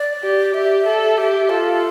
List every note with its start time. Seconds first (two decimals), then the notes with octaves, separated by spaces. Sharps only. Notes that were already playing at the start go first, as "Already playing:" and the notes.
Already playing: D5
0.23 G4
0.54 G4 E5
0.87 A4
1.17 G4 E5
1.49 F4 A4